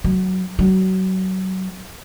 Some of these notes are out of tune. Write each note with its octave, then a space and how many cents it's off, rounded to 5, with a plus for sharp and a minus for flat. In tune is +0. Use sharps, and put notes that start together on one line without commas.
F#3 +10
F#3 +25